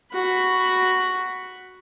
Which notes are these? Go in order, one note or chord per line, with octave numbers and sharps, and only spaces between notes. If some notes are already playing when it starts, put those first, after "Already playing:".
F#4 B5